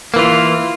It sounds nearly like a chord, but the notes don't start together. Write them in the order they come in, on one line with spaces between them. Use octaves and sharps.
A#3 E3 F4